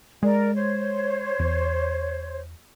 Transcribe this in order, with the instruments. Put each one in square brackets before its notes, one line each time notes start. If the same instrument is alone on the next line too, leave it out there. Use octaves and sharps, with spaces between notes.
[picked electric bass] G#3 [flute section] A#4 D5
[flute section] C5 C#5
[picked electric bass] E2